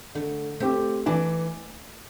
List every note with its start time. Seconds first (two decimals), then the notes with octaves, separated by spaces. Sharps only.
0.15 D3 A3
0.60 A3 C4 G4
1.06 E3 D4